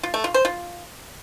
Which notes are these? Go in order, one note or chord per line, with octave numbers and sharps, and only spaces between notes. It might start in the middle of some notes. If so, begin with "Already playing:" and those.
F4
A3
F4
C5
F4